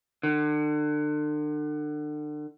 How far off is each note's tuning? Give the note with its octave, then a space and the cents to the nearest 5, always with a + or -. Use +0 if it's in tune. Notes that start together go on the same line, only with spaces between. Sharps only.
D3 +35